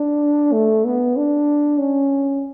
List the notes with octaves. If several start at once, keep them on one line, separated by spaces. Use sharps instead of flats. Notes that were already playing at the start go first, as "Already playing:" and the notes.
Already playing: D4
A3
B3
D4
C#4